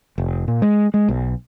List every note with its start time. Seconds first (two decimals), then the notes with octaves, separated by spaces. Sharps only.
0.18 F1
0.48 A#2
0.62 G#3
0.94 G#3
1.09 B1